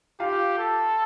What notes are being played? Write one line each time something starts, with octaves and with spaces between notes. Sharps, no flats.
F4 G4 F5
A4